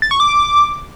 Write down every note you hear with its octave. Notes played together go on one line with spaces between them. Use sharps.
A6
C#6
D6